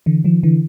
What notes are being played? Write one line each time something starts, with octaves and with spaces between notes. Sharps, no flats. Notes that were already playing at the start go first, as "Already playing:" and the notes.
D3 E3
D#3 F3
D3 E3